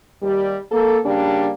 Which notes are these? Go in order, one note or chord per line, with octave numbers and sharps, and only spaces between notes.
D#2 G3
A#3 A4
C#3 G3 A#3 D4